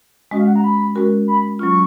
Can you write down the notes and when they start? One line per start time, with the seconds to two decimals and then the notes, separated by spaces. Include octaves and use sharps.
0.31 G#3 C#4 F#4 D#5
0.39 F5
0.47 F#5
0.56 A#5
0.64 B5
0.95 G#3 C#4 F#4 A#4
1.28 B5
1.59 F#3 C#4 F4 C#6